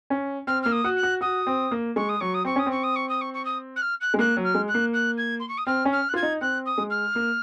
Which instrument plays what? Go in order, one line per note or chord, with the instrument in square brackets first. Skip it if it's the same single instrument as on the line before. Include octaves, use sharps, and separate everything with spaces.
[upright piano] C#4
[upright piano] C4 [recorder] F6
[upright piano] A#3 [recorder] F6
[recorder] D#6
[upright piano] F#4
[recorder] F#6
[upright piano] F#4
[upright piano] F#4 [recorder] D#6
[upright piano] C4
A#3
[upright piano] G#3 [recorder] C#6
[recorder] D#6
[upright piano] F#3 [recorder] C#6
[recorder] D#6
[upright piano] C4 [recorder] C#6
[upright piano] C#4 [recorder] D#6
[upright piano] C4 [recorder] C#6
[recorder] D#6
C#6
D#6
C#6
C#6
D#6
F#6
F6
F#6
[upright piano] G#3
[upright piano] A#3 [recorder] F#6
[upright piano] F#3
[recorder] F6
[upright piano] G#3
[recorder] F#6
[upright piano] A#3
[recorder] F#6
G#6
C6
C#6
D#6
[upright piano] C4 [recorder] F6
[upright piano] C#4
[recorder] F6
F#6
[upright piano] F4 [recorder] G#6
[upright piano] D#4
[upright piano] C4 [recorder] F#6
[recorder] D#6
[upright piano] G#3
[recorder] F6
[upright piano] A#3